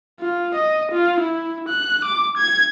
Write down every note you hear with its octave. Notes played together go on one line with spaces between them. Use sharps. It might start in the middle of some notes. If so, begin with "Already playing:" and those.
F4
D#5
F4
E4
F#6
D6
G#6